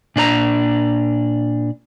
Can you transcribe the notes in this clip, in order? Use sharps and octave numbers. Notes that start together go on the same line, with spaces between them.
A#2 D4 B4 A#5